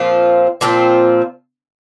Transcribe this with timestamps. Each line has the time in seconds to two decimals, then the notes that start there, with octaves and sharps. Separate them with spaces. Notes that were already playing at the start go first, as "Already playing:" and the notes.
Already playing: A#2 F3 C4 F4
0.61 A#2 F3 C4 F4